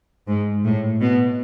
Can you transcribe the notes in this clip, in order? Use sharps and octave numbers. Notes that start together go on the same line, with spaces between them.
G#2
A2
B2